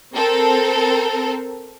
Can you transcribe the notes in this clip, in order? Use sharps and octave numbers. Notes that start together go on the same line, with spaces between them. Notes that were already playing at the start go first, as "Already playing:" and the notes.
C4 A4 A#4